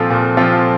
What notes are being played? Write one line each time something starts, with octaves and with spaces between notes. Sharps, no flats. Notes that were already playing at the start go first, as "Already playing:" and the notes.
Already playing: A#2 F3 C4 F4 A4
A#2
F3 C4 F4 A4